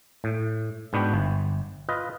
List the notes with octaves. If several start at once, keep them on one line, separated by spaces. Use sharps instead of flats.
A2
G#2 B3 D4 F#4 B4 G5
G1
F4 B4 D#5